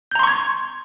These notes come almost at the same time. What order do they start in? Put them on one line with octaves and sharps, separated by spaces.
G6 A#5 C6 C#6 G#6